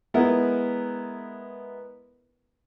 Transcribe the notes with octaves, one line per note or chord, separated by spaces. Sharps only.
G#3 B3 E4 A#4 B4 E5